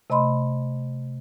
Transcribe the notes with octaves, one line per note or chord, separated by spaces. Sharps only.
C3 A3 D#5 B5 C6